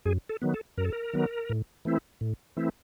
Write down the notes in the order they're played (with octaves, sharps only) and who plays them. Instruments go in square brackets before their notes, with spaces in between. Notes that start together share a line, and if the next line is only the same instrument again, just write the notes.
[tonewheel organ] F#2 G#4
A4
D#3 F#3 B3
A4
F#2 A#4
A4
A#4
D#3 F#3 B3
A2
E3 A3 C4 E4
A2
E3 A3 C4 E4